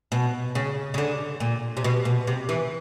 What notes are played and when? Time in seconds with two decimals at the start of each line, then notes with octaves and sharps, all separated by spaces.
0.12 B2
0.55 C#3
0.94 C#3
0.98 D3
1.40 A#2
1.77 C3
1.84 B2
2.05 B2
2.27 C3
2.49 E3